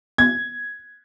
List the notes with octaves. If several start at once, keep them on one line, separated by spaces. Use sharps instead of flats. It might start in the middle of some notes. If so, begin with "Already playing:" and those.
G#6